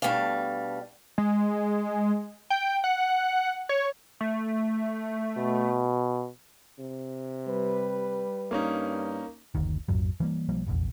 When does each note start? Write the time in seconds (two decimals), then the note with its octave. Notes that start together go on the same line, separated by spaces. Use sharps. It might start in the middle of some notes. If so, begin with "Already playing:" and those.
0.02 B2 G3 A3 D4 F5
1.18 G#3
2.50 G5
2.84 F#5
3.69 C#5
4.21 A3
5.38 B2
6.78 C3
7.47 G3 B4
8.51 G2 A#3 C#4 D#4
9.55 F#1 D2 D#3
9.88 A#1 F2 G#2 F#3
10.20 E3 G3 A#3
10.49 B1 F3 G3 A#3
10.67 F1 A#1 E2